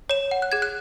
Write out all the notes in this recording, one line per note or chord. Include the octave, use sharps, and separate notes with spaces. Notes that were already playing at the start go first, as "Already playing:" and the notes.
C#5 E7
F#5
F#6
G#4 G#6
F#6